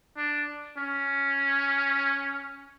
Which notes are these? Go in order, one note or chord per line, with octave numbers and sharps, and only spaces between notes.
D4
C#4